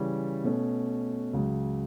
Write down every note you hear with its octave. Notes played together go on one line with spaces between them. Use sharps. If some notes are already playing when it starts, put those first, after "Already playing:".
Already playing: C#3 E3 G3 C#4
B2 A3 C#4
C#2 C#3 F#3